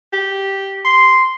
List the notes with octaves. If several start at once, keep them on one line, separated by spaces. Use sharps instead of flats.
G4
C6